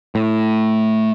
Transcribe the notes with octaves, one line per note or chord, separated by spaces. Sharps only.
A2